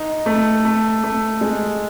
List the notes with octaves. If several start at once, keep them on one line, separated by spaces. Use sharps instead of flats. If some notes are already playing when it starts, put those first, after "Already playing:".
Already playing: D#4
A3
A3
A3
G#3